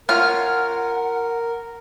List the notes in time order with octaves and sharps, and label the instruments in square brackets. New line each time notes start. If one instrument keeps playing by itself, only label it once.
[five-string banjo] C#4 F4 [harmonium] A#4 [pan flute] F#5 [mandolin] F6